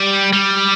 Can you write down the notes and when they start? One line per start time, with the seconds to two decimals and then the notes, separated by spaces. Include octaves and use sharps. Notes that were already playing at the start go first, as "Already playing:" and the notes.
Already playing: G3
0.33 G3